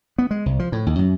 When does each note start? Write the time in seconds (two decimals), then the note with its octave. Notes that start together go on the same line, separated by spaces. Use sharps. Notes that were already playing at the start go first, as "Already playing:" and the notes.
0.18 B3
0.31 G#3
0.46 C2
0.59 F3
0.72 A2
0.86 D#2
0.99 F#2